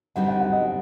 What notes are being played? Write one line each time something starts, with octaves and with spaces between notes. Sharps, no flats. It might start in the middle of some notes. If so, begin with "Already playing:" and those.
D3 G3 C4 D#4 F#5
F#5
F#5
D#5